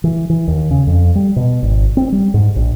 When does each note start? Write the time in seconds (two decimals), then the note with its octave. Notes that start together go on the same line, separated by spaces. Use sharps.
0.04 E3
0.30 E3
0.48 D#2
0.71 C#3
0.87 F2
1.15 G3
1.36 B2
1.63 G#1
1.97 C4
2.12 G3
2.34 G#2
2.56 A#1